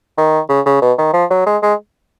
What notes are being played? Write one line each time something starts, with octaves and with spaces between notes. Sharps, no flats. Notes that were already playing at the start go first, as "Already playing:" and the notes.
D#3
C#3
C#3
B2
D#3
F3
F#3
G#3
G#3